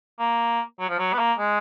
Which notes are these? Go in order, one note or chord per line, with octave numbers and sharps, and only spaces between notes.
A#3
F#3
F3
F#3
B3
A#3
G#3